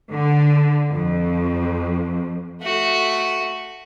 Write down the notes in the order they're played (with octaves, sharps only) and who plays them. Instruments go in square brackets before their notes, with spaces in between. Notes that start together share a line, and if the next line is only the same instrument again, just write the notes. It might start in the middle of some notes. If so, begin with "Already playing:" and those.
[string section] D3
F2
[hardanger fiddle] A3 F#4